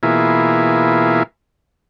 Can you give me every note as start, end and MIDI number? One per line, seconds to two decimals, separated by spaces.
0.03 1.23 47
0.03 1.23 52
0.03 1.23 58
0.03 1.23 64
0.03 1.23 65
0.03 1.23 68